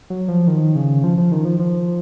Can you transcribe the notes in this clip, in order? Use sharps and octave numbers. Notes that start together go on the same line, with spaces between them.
F#3
F3
D#3
C#3
F3
F3
D#3
F3
F3